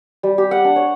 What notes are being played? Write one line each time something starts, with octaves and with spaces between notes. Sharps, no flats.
G3
G4
F#5
D4
C#5